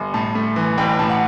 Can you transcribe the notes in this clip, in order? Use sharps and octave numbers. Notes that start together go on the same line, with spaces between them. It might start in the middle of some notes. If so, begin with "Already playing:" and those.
Already playing: G1
A2 A5
A3
E3
A1 G5
A2 A5
F#5